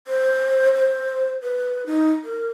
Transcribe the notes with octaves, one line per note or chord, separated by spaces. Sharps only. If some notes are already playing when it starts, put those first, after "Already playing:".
C5
C5
B4
D#4
A#4